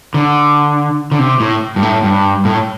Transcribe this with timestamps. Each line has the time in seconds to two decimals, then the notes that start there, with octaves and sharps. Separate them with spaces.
0.14 D3
1.12 D3
1.19 C3
1.40 A2
1.76 G2
1.83 A2
2.03 G2
2.45 A2